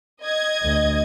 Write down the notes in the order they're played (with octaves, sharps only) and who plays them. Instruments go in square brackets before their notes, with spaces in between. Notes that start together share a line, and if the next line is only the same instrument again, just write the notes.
[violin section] D#5 G#6
[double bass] D2